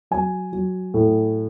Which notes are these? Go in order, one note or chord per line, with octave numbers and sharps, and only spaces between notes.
F#3 G#5
F#3
A2